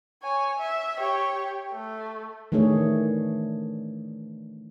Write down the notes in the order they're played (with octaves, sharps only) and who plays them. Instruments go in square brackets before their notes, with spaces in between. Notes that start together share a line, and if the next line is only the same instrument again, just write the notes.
[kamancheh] C#5 G#5
E5
G4 C#5
A3
[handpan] D#3 E3 A3 D4 G#4 C#5